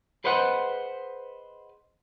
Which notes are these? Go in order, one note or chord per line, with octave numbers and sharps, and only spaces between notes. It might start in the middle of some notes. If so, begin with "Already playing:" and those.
G#4 B4 C5 D#5 F#5